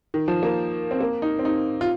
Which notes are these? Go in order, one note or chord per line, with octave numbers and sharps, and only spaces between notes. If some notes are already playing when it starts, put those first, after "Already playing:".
D#3
F3
A#3
C4
A#3
D#4
C4
D#4
F4